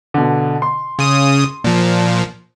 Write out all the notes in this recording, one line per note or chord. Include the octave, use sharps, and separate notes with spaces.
B2 D3
C6
C#3 D#6
A#2 F3